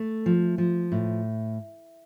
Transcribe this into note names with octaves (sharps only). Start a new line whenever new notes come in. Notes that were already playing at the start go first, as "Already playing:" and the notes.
Already playing: A3
F3
F3
A2